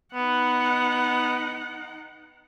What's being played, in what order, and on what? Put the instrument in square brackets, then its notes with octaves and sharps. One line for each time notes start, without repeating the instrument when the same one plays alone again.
[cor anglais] B3 [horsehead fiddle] D#4 F#5